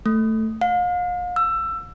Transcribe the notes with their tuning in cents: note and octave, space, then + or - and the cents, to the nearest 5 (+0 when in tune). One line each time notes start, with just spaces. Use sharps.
A3 +5
F5 +40
E6 +20